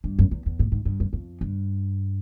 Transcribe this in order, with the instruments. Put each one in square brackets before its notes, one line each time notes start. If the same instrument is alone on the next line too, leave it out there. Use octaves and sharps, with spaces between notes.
[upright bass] G2
F#2
E2
E2
A2
G#2
G2
F#2
F2
G2